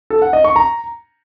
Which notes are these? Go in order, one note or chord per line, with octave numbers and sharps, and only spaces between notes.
A4
F#5
D#5
C#6
A#5